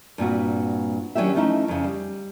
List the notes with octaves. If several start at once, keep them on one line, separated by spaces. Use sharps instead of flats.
G2 A#2 C4 F#4
D#3 F#3 C#4 D4 G4 E5
F3 A3 C#4 D#4 E4
F2 C#3
G3